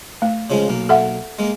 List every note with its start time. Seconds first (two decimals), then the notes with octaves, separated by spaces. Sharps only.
0.22 A3
0.50 C#3 F3 G#3
0.68 B1 A#3
0.89 A4 E5 F#5
1.39 G#3 A#3